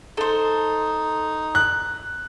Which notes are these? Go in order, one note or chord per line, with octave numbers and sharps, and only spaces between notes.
D#4 A4 C5
F#6